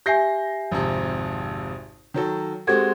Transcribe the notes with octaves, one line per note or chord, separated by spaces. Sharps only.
G4 E5 G#5 G6 A#6 C7
G#1 F2 C3
D#3 F#3 A4
G#3 C4 F#4 G4 A4 G#6